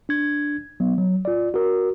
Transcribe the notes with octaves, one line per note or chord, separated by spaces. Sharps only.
D4 G#6
F#3 B3
F#3
F4 D5
F#4 A#4